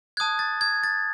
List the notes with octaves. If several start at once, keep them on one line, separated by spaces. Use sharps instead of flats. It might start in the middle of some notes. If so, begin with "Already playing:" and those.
A5 D#6 F#6 G#6
A6
G#6
A6